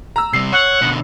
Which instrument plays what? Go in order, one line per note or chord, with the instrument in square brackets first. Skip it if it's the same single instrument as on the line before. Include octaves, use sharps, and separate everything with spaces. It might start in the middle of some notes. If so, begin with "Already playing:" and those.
[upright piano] A#5 E6
[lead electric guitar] C3 G3 [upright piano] C7
[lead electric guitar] C#5 [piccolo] F#5
[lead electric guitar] B2 D3